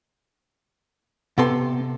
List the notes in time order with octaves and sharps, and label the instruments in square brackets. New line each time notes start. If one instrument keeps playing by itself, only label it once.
[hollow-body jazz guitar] C3 A4 C6 [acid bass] B3